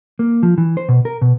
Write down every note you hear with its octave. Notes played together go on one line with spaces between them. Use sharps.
A#3
F3
E3
C5
B2
A#4
B2